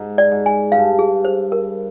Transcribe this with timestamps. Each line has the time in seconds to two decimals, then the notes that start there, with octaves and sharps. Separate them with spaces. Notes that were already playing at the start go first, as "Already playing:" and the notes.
Already playing: G#2
0.18 D5
0.32 G#2
0.46 G#5
0.72 G2 F5
0.99 G#4
1.25 C5
1.52 A#4